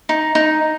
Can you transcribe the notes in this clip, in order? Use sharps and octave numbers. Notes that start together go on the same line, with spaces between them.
D#4
D#4